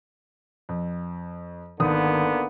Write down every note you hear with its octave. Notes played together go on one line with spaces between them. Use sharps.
F2
G#1 D3 A#3 B3 D#6